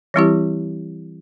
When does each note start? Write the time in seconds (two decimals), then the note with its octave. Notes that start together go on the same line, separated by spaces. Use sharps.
0.14 E3 G3 C4 E4 G4